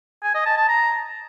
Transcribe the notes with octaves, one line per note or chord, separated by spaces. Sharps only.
G#5
D#5
A5
A5
A#5